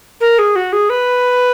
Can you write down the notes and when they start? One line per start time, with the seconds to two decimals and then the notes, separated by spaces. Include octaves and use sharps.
0.20 A#4
0.38 G#4
0.55 F#4
0.72 G#4
0.89 B4